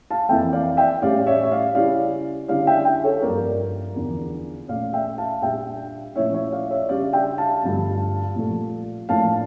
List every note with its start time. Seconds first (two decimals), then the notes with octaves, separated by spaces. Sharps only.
0.11 F5 A5
0.29 F2 E3 A#3 E5 G5
0.53 D5 F5
0.77 E5 G5
1.02 A2 G3 C#4 D5 F5
1.27 C#5 E5
1.43 E5
1.51 D5 F5
1.75 C#3 G3 C#4 E4 D5 F5
2.48 D3 G3 C#4 E4 D5 F5
2.67 E5 G5
2.85 E5 G5
3.04 A4 C#5
3.22 G2 F3 A#3 A#4 D5
3.96 E2 D3 F3
4.68 A#2 A3 C#4 D5 F5
4.93 E5 G5
5.18 F5 A5
5.42 A#2 G3 D4 E5 G5
6.16 A#2 F3 A3 C#4 E4 C#5 E5
6.34 C#5 E5
6.52 D5 F5
6.71 C#5 E5
6.89 C#3 G3 D4 D5 F5
7.13 E5 G5
7.38 F5 A5
7.63 G2 D3 F3 A3
8.36 A#2 F3 A3
9.09 A2 F3 A#3 D4 F5 A5